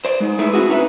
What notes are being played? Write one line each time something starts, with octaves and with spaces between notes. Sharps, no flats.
C5 D5
G#3 D#4
A3 D#4 E4 G#4 B4
C4 E4 F#4 G#4
C#4 D#4 B4 E5